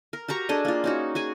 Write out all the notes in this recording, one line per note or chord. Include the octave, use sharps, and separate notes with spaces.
A#4
F#4 G4 A#5 C#6
D4 G#4 A4 D#5
A#3 F4
C#4 D#4 F#4
F#4 G#4 G#5